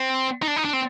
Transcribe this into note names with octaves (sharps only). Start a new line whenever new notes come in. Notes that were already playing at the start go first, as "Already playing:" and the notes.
Already playing: C4
D#4
D4
D#4
D4
C4